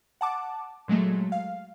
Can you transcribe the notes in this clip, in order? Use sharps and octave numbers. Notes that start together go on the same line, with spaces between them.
F#5 A5 D6
A#2 F#3 G#3 A3
F5